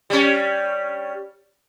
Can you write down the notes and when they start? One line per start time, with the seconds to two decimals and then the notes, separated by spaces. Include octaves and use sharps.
0.10 G3 C#4